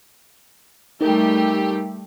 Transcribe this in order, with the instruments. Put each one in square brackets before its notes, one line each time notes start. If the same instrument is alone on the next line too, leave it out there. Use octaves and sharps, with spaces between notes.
[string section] G3 A3 G4 [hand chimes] D#4 A#4